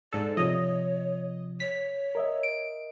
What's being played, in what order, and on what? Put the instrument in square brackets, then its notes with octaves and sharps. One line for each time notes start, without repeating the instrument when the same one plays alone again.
[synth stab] G#2 A4 [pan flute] D5
[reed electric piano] C3 F3 [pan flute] C#5 [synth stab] D#5
[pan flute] C#5 [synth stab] B6
[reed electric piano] A#4 D#5 E5
[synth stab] D7